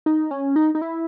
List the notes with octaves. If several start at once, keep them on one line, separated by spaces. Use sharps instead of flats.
D#4
C#4
D#4
D#4
E4